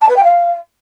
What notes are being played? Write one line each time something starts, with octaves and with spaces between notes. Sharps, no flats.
A5
B4
G5
F5